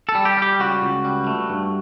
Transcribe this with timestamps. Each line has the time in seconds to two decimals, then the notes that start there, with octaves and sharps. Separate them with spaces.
0.09 A4
0.15 G3
0.25 G4
0.37 G3 G4
0.60 C#2 F#4
0.82 C#2
1.05 G3
1.27 A3
1.50 G2